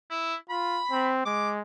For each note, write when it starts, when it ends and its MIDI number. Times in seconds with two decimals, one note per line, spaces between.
0.10 0.35 64
0.49 0.81 65
0.49 1.11 83
0.91 1.22 60
1.26 1.61 56
1.26 1.49 86